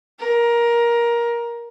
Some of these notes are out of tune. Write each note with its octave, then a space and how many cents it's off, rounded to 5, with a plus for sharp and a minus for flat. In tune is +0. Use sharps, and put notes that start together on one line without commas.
A#4 +15